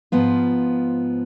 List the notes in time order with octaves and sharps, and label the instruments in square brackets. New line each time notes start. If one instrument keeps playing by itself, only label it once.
[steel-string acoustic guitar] G#2 F3 B3 F4